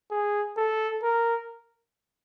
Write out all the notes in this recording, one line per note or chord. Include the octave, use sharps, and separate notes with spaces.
G#4
A4
A#4